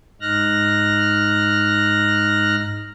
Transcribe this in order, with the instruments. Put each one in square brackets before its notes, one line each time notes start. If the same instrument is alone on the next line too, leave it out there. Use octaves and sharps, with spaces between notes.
[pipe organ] G#2 D#4 F6 F#6 A#6